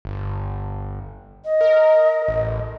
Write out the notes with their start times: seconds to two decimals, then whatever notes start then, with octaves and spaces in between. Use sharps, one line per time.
0.05 G1
1.45 D#5
1.61 A#4
2.28 A1